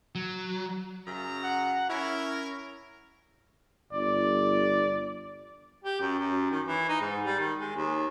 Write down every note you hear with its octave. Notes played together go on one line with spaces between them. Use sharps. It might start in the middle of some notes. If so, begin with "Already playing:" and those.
F#3
F#2 C#3 A#5
F#5
C#4 E4 A#4
G1 D5
G4
F#2
F#2
D#3
E3
D#4
G#2
G3
D#3
G#3
D#2